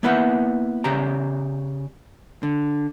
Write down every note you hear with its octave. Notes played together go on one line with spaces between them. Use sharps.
A#3 B3 E4 B4 E5 F#5
C#3 G4 C5 D5 A#5
D3